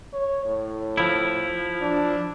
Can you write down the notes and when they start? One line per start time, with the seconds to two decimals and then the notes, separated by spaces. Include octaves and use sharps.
0.13 C#5
0.46 A2
0.97 F3 E4
1.82 D4